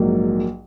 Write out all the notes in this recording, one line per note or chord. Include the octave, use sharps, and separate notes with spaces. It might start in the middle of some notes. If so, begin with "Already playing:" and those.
Already playing: A#1 G#2 F#3 A#3